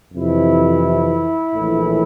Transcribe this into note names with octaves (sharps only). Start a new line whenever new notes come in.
F2 C3 E3 E4
A#1 A2 E3